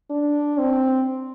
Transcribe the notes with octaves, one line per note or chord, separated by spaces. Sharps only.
D4
C4